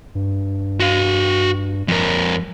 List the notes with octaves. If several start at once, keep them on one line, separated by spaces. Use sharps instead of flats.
G2
F#4 F5
F2 A#4